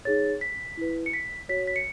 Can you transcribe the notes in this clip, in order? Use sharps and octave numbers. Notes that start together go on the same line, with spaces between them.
D#4 G#4 C#5 A6
B6
E4 B4
C#7
B6
F#4 C#5 B6
B6
C#7